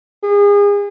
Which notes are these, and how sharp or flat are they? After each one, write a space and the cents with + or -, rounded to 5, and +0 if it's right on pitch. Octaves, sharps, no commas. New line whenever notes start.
G#4 -35